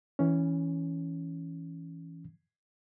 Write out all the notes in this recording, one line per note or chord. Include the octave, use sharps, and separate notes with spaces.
E3 C#4